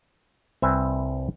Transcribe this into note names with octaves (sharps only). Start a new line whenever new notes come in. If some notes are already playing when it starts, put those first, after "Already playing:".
C2 C4 B4 E5 G#5